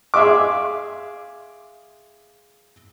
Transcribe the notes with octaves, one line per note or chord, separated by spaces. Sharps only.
G#4 E5 F5 C6 D6